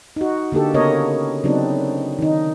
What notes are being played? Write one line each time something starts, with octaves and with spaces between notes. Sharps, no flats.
D#4 F#4
D3 A#3 G4 A4
C#3 A#3 B3 A#4 C#5 D#5
C#3 F#3 B3 C4 D4 D#4
D#3 D#4